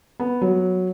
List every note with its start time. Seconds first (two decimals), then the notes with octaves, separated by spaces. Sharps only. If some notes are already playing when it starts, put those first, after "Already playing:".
0.20 B3
0.41 F#3